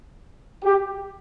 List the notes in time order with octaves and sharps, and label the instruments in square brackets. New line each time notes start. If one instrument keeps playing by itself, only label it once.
[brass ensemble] G4